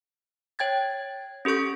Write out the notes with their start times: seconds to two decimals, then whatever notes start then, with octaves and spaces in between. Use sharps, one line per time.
0.59 C#5 G5 G#6 A6
1.45 C#4 G4 A4 C#6 G6